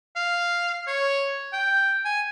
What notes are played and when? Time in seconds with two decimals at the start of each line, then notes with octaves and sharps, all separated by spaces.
0.16 F5
0.87 C#5
1.53 G5
2.05 G#5